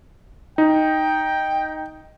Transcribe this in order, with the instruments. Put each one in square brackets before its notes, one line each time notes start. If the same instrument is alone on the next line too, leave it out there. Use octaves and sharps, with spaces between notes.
[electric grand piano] D#4 [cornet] G5